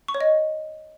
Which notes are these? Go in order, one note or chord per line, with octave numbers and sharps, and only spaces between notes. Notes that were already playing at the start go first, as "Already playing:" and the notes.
C#6
C#5
D#5